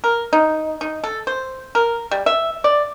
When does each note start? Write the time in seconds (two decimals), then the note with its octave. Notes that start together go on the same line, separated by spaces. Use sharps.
0.04 A#4
0.33 D#4
0.81 D#4
1.04 A4
1.27 C5
1.75 A#4
2.11 G3
2.26 E5
2.64 D5